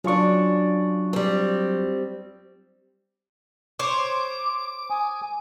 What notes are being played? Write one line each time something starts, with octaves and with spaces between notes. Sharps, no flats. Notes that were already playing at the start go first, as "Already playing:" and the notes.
C#3 F#3 D4 F4 C#6
G3 C4
C5 C#5 D6
G#5 D#6